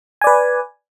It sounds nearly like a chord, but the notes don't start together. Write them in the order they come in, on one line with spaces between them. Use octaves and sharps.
G#5 D5 B4